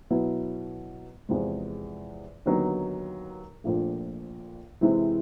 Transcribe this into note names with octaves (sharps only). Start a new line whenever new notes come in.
B2 F#3 B3 E4
E2 C3 F3 G#3
D#2 D3 F#3 B3 D#4
A#1 A#2 F3 A3
C3 E3 G#3 C4 E4